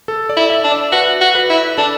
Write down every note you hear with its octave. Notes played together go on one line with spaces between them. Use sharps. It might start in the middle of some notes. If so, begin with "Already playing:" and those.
A4
D5
E4
E5
D4
D5
F#4 B4
F#4
B4
E4
D4 A4